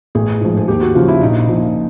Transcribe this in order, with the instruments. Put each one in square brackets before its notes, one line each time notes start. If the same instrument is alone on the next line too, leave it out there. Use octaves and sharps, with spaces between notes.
[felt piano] A1 G#4
G#2 F3
G#4
D#2 G4
F#4
C#3 F3 F4
E4
A#1 D#4
A#2 F3